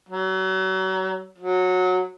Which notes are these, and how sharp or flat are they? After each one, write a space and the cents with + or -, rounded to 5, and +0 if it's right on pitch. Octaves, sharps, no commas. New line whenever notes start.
F#3 +35
F#3 -15